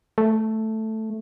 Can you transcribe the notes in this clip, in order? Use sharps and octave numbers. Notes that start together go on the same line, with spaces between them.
A3